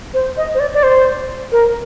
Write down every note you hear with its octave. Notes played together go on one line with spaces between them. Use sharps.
C5
D#5
C5
D5
D5
C5
A#4